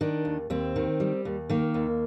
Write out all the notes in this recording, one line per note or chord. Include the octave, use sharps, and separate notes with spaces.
D#3 D4
D#2
D#2 C4
D#3
G3
D#2
D#3 A#3
D#2